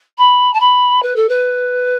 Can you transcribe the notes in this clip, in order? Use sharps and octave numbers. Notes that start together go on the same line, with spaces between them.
B5
A5
B5
B4
A4
B4